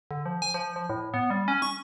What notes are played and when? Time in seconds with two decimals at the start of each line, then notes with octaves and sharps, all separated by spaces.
0.11 D3
0.26 F3
0.42 G#5
0.54 F3
0.76 F3
0.89 A2
1.14 B3
1.30 G3
1.48 C#4
1.62 C#6